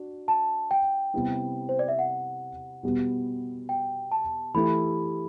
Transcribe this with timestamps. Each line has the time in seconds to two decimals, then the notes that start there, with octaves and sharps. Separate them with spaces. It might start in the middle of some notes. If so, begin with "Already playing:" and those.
Already playing: D4 F#4
0.28 A5
0.71 G5
1.14 C3 G3 B3 E4
1.69 C5
1.79 D5
1.88 E5
1.99 F#5
2.83 B2 G3 B3
3.69 G5
4.12 A5
4.54 E3 A3 E4 G4 B5